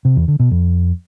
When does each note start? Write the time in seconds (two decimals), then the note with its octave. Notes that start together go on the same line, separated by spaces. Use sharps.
0.05 C3
0.16 E2
0.28 D3
0.40 B2
0.51 F2